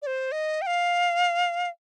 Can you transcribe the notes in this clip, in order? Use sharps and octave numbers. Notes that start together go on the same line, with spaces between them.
D5
C5
D#5
G5
F5